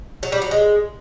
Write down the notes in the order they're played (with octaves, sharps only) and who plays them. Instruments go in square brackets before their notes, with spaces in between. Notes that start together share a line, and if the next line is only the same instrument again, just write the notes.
[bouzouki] F#3
G3
F#3
G#3